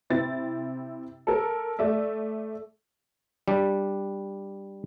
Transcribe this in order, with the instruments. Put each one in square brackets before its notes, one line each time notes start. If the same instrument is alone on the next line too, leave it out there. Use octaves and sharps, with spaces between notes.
[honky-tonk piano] C3 C4 E4 A6
A4 A#4
A3 D5 E5
[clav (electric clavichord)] G3 D4